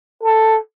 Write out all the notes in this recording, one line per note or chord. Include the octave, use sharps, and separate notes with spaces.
A4